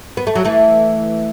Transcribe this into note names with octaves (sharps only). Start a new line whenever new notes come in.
B3
A3
F#3
E3 A3